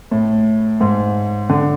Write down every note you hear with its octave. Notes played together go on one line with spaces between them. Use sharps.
A2
G#2
D3